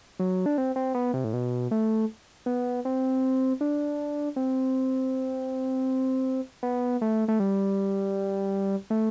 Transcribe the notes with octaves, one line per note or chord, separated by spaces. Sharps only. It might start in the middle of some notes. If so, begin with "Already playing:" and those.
F#3
D4
C4
C4
B3
C3
A2
B2
A3
B3
C4
D4
C4
B3
A3
A3
G3
A3